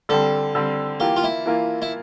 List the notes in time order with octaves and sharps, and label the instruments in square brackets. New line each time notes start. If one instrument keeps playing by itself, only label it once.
[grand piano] D3 G3 C4 [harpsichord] A4
[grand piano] D3 G3 C4
[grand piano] E3 A#3 F4 [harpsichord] G4
[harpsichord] F4
E4
[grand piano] E3 A#3 F4
[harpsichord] E4